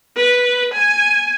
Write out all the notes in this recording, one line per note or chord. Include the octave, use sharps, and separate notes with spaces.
B4
G#5